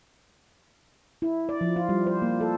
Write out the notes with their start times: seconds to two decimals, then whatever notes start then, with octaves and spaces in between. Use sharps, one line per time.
1.22 E4
1.49 D5
1.61 F3
1.76 F4
1.89 G3
2.07 C5
2.22 A#3
2.41 A4